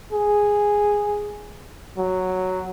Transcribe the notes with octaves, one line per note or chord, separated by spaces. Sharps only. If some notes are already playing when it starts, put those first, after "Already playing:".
G#4
F#3